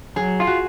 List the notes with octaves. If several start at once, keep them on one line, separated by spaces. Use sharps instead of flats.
F#3 G#4
F4
F#4